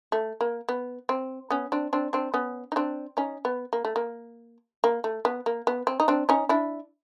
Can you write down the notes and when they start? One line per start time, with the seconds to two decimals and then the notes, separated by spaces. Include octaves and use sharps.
0.12 A3
0.41 A#3
0.69 B3
1.09 C4
1.50 B3 C#4
1.72 C4 D4
1.93 C4 D4
2.13 C4 D4
2.34 B3 C#4
2.72 D#4
2.76 C4 D4
3.17 C#4 D#4
3.45 B3
3.73 A#3
3.85 A3
3.96 A#3
4.84 A#3
5.04 A3
5.25 B3
5.46 A#3
5.67 B3
5.87 C4
6.00 D#4
6.08 C4 D4
6.29 C#4 D#4
6.49 D4 E4